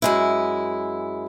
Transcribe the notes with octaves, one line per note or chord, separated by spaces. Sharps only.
F#2 G#3 E4